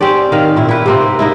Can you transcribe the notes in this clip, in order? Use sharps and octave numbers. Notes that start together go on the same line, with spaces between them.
C4 C#4 G4 D5
D#3 F5
A#2 E4
E4 B4
C3 A#3 C4
A#3 D#4 E4